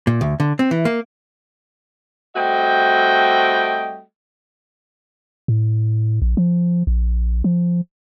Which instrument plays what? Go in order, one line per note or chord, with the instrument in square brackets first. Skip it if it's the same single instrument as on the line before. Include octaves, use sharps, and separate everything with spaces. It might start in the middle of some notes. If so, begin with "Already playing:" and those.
[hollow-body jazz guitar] A#2
D2
D3
C4
E3
A#3
[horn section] G3 A3 C4 F#4 D#5 G5
[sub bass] A2
A#1
F3
A#1
F3